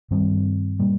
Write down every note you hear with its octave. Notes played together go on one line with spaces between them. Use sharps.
G2 D#3 G3 C4
A#2 G3 A#3